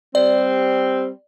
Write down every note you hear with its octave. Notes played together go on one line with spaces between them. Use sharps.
G3 C4 D5